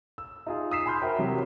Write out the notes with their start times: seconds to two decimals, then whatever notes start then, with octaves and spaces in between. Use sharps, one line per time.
0.18 E6
0.46 D#4 F4 G#4
0.71 D#6 E6 B6 C7 E7
0.86 G#5 B5 C6 F6 G6
1.01 F#4 A#4 C5 E5 G5
1.19 C3 E3 F#3 G4